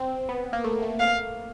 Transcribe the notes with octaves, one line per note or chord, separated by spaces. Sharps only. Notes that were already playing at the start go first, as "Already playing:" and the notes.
Already playing: C4
B3
A#3
A3
A3
F5